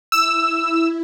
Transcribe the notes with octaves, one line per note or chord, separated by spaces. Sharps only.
E4 E6